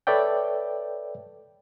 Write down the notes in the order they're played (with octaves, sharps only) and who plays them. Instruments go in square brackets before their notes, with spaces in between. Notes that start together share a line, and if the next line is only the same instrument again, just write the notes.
[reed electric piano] A4 B4 C#5 D5 E5 G5